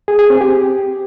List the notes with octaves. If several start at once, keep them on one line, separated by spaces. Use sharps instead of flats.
G#4
G#4
C4
G4